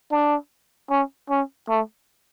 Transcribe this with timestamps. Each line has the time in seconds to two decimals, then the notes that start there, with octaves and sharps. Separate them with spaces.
0.11 D4
0.90 C#4
1.30 C#4
1.69 A3